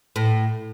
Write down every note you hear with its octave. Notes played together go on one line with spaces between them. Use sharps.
A2